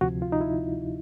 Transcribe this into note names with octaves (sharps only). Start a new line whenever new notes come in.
D2 C3 F3 F#4
F4
D#4
E4